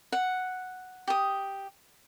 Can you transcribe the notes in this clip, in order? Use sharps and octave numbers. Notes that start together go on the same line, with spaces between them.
F#5
G4 D#6